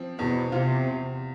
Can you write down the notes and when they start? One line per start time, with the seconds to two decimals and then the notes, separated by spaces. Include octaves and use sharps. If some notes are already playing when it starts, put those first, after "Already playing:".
Already playing: F3 C4
0.19 E2 B2
0.52 C3 F4